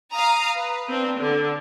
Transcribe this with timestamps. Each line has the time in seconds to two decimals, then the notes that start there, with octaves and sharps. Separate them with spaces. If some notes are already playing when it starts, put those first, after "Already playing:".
0.14 F5 A#5 D#6
0.56 B4
0.88 C4 D4
1.18 D3